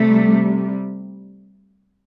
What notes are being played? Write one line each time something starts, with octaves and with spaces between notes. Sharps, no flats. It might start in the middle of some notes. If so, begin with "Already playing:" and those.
Already playing: C3 G3 A3